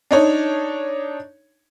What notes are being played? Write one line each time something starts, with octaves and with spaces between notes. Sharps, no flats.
D4 D#4 C#5